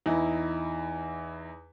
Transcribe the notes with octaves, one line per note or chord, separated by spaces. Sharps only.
E2 D#4 E4